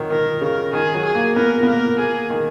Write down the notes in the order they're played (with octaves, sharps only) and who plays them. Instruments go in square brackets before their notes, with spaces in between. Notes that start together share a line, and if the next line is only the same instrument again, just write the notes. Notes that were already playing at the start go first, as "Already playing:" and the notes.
Already playing: [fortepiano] D#3 F#3
[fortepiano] D#3 [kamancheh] A#4
[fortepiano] C#3 [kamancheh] A#4
[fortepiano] D#3 [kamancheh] G#4
[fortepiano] F#3
[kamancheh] G#4
[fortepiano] A#3
[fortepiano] B3 [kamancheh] A#4
[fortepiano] B3
[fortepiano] A#3 [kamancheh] A#4
[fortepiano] A#3 [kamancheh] G#4
[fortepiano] D#3